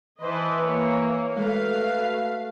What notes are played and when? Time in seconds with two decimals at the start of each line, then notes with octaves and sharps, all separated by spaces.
0.21 E3 E4 B4 C5 D#5 A5
0.64 A#3 C#5
1.37 G#3 A3 F#4 A4 B4 F5